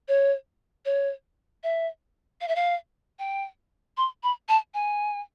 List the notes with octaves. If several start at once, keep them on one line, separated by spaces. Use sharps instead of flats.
C#5
C#5
E5
F5
E5
F5
G5
C6
B5
A5
G#5